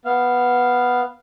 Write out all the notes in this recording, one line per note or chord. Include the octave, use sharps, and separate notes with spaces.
B3 F5